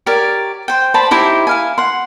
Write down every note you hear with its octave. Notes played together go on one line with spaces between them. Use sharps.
G4 A#4 C#5 D5
C5 G5
C5 D5 A5 B5
D#4 E4 G4 C5
E4 F5 G#5
F#5 C6